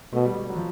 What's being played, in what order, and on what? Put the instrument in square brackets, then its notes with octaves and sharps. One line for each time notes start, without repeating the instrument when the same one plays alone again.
[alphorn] B2 [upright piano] A3
[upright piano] G3
G3
F#3
F3